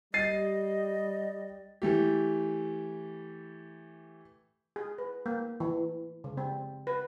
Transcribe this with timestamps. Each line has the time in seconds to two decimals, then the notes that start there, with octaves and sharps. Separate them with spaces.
0.14 G3 D#5 A6 C7 D#7
1.82 E3 A3 G4
4.76 G#4
4.98 B4
5.26 A#3
5.60 E3
6.24 C#3
6.37 C4
6.87 B4